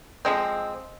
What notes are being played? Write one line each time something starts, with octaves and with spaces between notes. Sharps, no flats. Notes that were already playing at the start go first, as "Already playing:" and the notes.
F3 G#3 C4